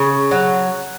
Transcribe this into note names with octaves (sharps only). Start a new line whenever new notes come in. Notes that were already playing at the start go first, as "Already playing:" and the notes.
Already playing: C#3
F#3